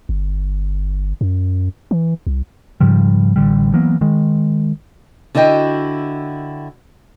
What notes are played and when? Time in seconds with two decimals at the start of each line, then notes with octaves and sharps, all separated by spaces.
0.09 G1
1.21 F#2
1.91 E3
2.27 C2
2.80 G#2 C#3 F3 G3
3.36 A1 D3 G3
3.74 E3 F#3 A#3 B3
4.01 D#3 G#3
5.35 D3 E4 F#4 D#5 G5